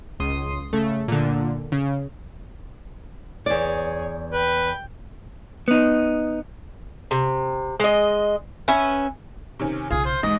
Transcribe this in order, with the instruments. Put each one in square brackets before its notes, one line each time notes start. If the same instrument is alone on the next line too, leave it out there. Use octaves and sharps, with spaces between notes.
[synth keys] C#2 C6 D#6
C#3 A3
A#2 D3
C#3
[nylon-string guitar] E2 D5 [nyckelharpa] G#4 C#5
[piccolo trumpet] B4 [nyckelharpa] G5
[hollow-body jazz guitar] B3 D#4
[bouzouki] C3
G#3 D#5
C#4 B4 E5
[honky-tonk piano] C3 D#3 C#4
[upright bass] B1 C#3 [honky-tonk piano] F4 [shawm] G#4
[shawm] C5
[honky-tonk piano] A1 G#2 [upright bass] G#3 [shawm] D#5